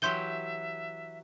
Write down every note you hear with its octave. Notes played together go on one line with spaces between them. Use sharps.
E3 F#3 G4 E5 C6 G6 G7